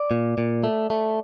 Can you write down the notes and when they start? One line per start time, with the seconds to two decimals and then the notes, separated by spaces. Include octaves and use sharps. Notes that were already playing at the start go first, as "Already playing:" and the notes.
Already playing: D5
0.11 A#2
0.38 A#2
0.64 A3
0.90 A3